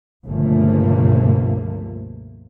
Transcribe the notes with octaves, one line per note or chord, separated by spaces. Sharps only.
G1 C#2 B2 F3 A3 A#3